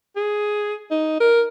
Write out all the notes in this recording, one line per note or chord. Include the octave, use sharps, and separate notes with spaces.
G#4
D#4
A#4